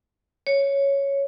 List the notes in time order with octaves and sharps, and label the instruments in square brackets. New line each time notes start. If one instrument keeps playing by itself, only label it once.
[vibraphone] C#5